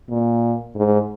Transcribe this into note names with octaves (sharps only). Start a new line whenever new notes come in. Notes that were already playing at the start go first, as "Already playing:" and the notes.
A#2
G#2